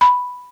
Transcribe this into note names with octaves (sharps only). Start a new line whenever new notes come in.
B5